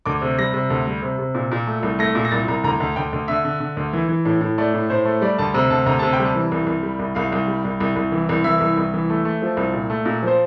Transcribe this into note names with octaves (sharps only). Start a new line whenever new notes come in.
D2 D6
C3
G3 A#6
C3
D2
G3
C3
C3
A#2
A#2
A3
C2
A3 A#6
A#2
A#6
C2 A6
C2 A#5
D2 A#5
D2
D2 G5
D2
D3 E5
D3
D3
D2
E3
E3
A2
A2
A3 D5
A2
A2 C5
A3
G3 D5
D2 A5
C3 A#5
D2 A5
D2 A#5
C3 A5
G5
G3
A5
E3
C2
C2
G3
C2
C2 F5
C2
G3
C2
C2
C2
E3
C2
E3 E5
C2
C2
E3
A3
A3
F3
C2
A#2
A3
A#2
F3 C5